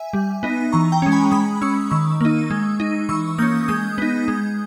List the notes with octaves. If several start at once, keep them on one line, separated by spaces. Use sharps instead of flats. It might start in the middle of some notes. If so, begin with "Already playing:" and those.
Already playing: E5 G#5
G3
B3 D#4
E3 A#5 C#6
G5 A#5
G#3 C#4
G#5 B5
G#3 B5 D#6
C#4 C#6 E6
D#3 C#6 E6
A#3 D#4
G#3
D#4
E3 C#6 E6
A#3 C#4 D#6 G6
G#3 D#6 G6
B3 D#4
G#3